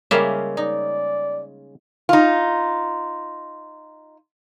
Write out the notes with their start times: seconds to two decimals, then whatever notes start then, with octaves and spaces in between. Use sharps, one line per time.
0.11 C#3 G3 G#3 A#3 C#4 E5
0.57 D#4 D5
2.09 D#4 F4